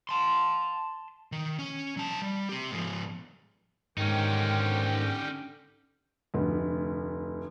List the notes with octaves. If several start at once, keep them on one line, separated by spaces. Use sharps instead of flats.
A5 C6
D#3
C#4
F#3 A5
G3
C4 G4
G#2 F3
G#2 D3 D#3 C#4 D#4 G4 G5
F1 D2